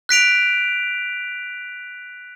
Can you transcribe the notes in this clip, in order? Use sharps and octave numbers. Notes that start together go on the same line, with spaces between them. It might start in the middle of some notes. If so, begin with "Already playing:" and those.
F#6 B6 D7 F7